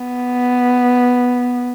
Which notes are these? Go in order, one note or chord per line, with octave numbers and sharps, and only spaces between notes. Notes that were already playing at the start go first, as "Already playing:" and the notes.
Already playing: B3